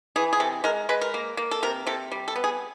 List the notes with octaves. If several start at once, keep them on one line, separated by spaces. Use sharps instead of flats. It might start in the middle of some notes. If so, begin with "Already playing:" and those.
E3 G#4
G#4
C3 A4
G#3 A#4
G#3 B4
A#4
A#3
A#3
A4
C3 A#4
C3 A4
G3
A4
B3
G#4